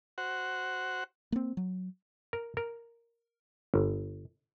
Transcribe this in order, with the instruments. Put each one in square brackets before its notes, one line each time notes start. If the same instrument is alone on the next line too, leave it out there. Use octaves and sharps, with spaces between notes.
[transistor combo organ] F#4 C5 F#5
[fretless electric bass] A#3 C4
F#3
[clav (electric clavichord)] A#4
A#4
G1